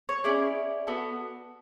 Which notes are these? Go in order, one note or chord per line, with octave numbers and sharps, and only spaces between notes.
C#5
C#4 E4 G#4 D5
B3 F#4 A4